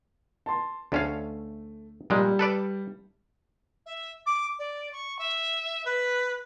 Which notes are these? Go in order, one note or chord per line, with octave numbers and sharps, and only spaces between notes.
A5 C6
D2 A3 C#4 F5
A#2 G3 G#3
A4 B4 D5
E5
D6
D5
C#6
E5
B4